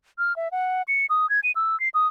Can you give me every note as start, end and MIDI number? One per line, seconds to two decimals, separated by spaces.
0.18 0.36 89
0.36 0.48 76
0.52 0.82 78
0.88 1.06 97
1.10 1.29 87
1.30 1.40 92
1.44 1.52 99
1.56 1.78 88
1.80 1.89 96
1.94 2.07 87